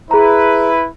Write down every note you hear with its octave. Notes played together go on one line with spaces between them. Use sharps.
E4 G#4 B4 A#5